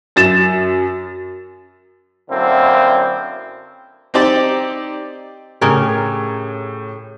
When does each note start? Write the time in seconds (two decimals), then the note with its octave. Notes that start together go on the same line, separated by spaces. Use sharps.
0.16 F#2 A6 E7
2.29 F#2 D3 A#3 C4 E4
4.14 C4 D#4 G4 D5
5.61 A2 C#3 G4 A#4 G#6